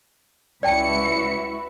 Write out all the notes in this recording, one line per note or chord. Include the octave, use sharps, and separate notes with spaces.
C#2 E4 F#4 B4 D5 G5 A5 C#7